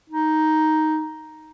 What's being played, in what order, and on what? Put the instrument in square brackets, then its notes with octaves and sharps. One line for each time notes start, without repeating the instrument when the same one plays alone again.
[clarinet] D#4